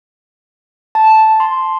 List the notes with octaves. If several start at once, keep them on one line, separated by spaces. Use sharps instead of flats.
A5
C6